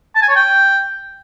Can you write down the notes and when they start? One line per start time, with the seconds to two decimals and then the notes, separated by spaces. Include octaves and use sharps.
0.16 A5
0.22 G#5
0.29 C#5
0.36 G5